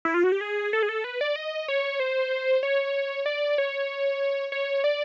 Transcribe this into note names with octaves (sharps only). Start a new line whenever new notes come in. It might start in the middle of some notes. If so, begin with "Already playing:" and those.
E4
F4
F#4
G4
G#4
A4
G#4
A4
B4
D5
D#5
C#5
C5
C#5
D5
C#5
C#5
D5